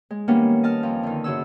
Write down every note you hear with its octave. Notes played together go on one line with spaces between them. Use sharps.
G#3
D#3 G3 A#3 B3 C#4 D4
D#5 A5 F6
F2 F3
D3 D#3
F#2 C#3 C#4 E6